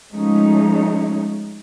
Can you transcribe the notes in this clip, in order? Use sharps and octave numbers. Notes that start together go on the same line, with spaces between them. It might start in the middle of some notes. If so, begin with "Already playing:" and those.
F3 G#3 A3 C#4 D#4